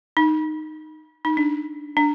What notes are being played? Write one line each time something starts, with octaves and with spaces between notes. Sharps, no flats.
D#4
D#4
D4
D4